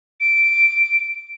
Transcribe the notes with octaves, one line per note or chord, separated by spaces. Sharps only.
D7